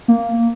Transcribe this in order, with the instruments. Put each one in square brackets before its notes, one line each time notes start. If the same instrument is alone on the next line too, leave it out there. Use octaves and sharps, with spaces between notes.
[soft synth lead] A#3